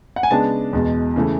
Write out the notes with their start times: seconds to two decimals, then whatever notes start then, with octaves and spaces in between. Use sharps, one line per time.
0.16 F#5
0.23 G#5
0.31 C#3 G#3 B3 D4 A5
0.73 E2 B2 G#3
1.16 C#3 E3 A3